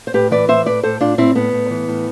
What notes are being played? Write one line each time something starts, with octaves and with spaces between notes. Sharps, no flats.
C5
A2 G4 B4
E3 B4 D5
A2 C5 E5
A2 B4 D5
A2 A4 C5
A2 D4 F4
A2 C4 E4
A2 B3
A2
E3
A2